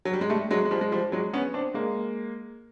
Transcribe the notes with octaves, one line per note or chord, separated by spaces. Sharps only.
F#3
G3
G#3
G3 A3
F#3 G#3
G#3
F3 G3
G#3
F3 G3
F#3 G#3
B3 C#4
C4 D4
G#3 A#3